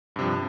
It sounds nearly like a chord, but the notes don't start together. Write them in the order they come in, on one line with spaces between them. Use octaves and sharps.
G2 C3 F3